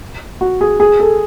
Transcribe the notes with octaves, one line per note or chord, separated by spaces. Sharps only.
F#4
G#4
G#4
A4